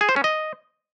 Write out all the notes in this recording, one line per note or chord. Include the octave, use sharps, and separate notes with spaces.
G#4
C5
C#4
D#5